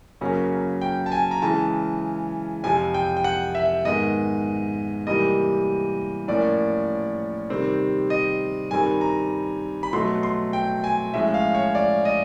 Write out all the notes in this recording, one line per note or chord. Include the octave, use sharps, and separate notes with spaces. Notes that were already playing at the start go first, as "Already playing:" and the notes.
F#2 C#3 F#3 A#3 C#4
G5
A5
G#5
A#5
C#3 E3 G#3 C#4 A5
F2 C3 F3 G#5
G5
G5
F#5
E5
G#2 D#3 G#3 B3 D#5
C3 E3 G3 A#3 D#5
A2 F3 A#3 C#4 D5
C3 D#3 G3 C4
D#5
G2 D#3 G3 C4 G#5
A#5
B5
B2 F#3 A3 C6
C6
G5
G#5
A2 F3 G#3 C#4 E5
F5
C#5
D5
D#5